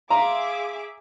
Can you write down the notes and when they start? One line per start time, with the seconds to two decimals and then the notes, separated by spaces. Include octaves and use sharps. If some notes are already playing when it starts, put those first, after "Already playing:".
0.10 G#4 E5 F5 A#5 C6 D6